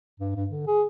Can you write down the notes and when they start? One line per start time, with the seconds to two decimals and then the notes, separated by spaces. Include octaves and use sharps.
0.20 G2
0.36 G2
0.50 D3
0.67 G#4